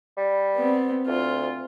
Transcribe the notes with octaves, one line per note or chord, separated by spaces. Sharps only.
G3
B3 C4
D2 F4